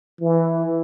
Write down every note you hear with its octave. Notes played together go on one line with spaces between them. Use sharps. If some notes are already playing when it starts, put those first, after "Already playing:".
E3